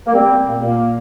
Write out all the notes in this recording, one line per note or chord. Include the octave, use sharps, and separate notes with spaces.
A#3
G3 C4
G3
A#2 A#3
A#2 A#3